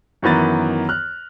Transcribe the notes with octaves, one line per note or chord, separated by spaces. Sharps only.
F#2 D#3 E3 B3 A6
F6 F#6